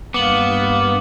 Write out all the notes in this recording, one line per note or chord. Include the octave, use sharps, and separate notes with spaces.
G2 A#3 B3 D6 F#7